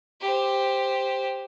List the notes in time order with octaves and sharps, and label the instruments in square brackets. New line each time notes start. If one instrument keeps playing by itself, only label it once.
[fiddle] G4 C5